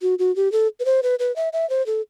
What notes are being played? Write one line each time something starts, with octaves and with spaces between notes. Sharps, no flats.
F#4
F#4
G4
A4
B4
C5
B4
B4
E5
E5
C5
A4